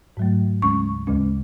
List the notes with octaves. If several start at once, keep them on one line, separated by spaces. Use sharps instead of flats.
G#2 F#3 A3
D2 C#3 G#3 C#4 C#6
D2 C#3 G#3 C#4